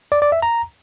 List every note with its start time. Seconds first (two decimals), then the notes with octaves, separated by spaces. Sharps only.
0.12 D5
0.22 D5
0.32 E5
0.42 A#5